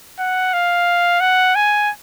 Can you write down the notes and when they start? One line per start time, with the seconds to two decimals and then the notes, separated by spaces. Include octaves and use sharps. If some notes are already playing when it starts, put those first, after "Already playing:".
0.19 F#5
0.53 F5
1.20 F#5
1.55 G#5